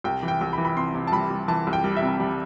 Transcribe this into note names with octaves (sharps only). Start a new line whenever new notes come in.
C2 G5
E3
G5
C2
B5
E3
B5
C3 C6
C3
A5
G3 B5
G3
E3 A5
C2
G5
G3
E5
C3
G3